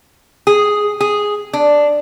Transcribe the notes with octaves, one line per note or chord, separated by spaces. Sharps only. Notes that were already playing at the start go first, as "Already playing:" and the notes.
G#4
G#4
D4